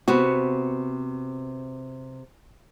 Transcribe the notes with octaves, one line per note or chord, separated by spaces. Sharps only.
C3 B3 F#4